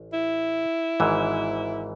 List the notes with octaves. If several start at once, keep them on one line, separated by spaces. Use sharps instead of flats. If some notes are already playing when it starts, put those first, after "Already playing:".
Already playing: A1
E4
G#1 G#2 E3